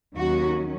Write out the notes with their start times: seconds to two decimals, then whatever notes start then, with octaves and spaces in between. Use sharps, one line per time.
0.15 D#2 D#3 F#3 C#4 F#4